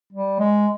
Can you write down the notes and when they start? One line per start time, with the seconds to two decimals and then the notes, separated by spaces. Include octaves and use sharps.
0.13 G3
0.39 G#3